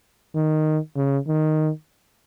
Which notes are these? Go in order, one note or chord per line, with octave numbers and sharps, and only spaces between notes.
D#3
C#3
D#3